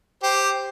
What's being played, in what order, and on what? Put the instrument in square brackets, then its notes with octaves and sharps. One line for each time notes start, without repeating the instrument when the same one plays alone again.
[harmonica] G4 C5